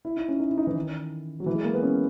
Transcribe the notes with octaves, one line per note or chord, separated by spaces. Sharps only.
E4
D#4
C#4
D#4
E4
D#4
E3
D#3
F#3
E3
G#3
A#3
B3
C#4